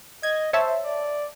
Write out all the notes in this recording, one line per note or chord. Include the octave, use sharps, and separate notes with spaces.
D#5 G#6
C5 C#5 E5 A5
D5